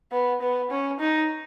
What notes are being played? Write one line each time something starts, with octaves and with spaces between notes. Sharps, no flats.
B3
B3
C#4
D#4